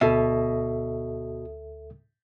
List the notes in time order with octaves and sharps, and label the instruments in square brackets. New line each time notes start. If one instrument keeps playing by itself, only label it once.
[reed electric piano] D2 A4 E5 [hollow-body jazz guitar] B2